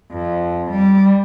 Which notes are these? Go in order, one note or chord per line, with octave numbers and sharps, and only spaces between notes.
F2
G3